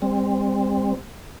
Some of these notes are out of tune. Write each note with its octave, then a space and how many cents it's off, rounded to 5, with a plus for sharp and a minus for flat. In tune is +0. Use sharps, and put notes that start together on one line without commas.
G3 +40 C4 +0